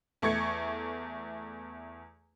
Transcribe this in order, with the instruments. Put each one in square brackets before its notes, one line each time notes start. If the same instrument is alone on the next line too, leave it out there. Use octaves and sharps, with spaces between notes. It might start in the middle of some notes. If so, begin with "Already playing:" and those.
[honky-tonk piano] E2 A3 C#6 G#6 C#7